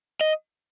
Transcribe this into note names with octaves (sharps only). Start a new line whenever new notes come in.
D#5